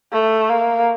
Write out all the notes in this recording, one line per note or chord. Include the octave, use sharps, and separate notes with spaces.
A3
A#3